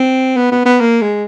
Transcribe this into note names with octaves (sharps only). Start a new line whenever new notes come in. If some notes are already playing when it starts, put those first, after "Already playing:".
Already playing: C4
B3
B3
B3
A#3
G#3